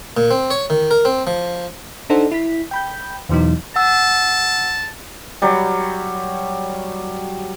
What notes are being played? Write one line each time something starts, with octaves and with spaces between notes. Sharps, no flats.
A#2
C4
C#5
D#3
A#4
C4
F3
D4 D#4 A4 C5 F#5
E4 B6
G5 B5 G6
E2 B2 E3 F#3 D#4
F#5 A5 E6
F#3 G3